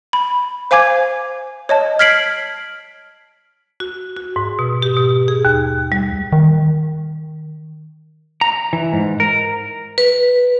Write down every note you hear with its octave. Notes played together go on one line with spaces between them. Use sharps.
B5
C5 F5 G#5 D6 G#6
C#5 D#5 A5
F6 G#6 B6 C7 D7 F#7
F#4
F#4
G#2
B2
G4
B2
G#4
D#2
G3
D#3
A#5
E3
G#2
A#4
B4